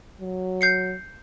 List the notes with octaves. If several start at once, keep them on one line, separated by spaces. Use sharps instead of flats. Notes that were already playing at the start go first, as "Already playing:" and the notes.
F#3
G6 C7 C#7